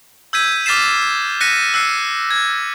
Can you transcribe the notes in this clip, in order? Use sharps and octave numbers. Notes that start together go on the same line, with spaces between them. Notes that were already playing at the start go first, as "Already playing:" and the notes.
E6 G6 G#6 B6 D#7
D6 F6 A6 B6 C7 E7
F#6 A#6 B6 C#7 D#7
E6 F#6 C7 C#7
G#6